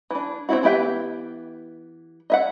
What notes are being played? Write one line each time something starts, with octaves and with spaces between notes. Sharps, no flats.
E3 D4
C4 D#4 E4 F#4
E3 B3 G4 E5 G5
D#5 E5 F#5